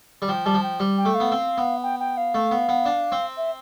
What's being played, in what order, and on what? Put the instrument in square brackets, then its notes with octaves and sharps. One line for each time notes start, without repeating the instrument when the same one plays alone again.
[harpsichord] G3
[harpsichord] F3 [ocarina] G5
[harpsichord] G3 [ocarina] A5
[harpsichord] F3
[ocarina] G5
[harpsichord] G3
[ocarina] G5
[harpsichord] A3
[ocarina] F5
[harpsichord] B3
C4
B3
[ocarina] G5
G5
F5
[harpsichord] A3
B3
B3
D4
C4
[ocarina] E5